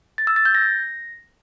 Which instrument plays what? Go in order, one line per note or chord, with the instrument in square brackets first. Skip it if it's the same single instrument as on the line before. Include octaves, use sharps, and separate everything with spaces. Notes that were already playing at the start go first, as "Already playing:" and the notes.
[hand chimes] A6
E6
A6
G6
A#6